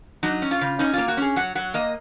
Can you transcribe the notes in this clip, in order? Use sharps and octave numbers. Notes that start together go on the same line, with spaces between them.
F#3 D#4
C#4
F4
C#3
C#4 D#4
A#3 F4
F#4
C#4 G#4
F#3 F#5
F#3 F#5
A#3 D#5